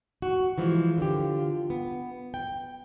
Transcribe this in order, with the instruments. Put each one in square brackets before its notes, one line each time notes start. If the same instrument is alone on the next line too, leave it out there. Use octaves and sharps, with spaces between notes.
[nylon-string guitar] F#4
[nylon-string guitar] E3 F3 G#3 [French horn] F4
[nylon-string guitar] D3 G4
B3
G5